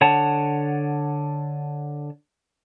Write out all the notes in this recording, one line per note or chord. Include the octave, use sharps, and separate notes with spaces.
D3 C#5 F#5 A5